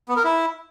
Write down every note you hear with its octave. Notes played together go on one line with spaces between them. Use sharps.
B3
A#4
E4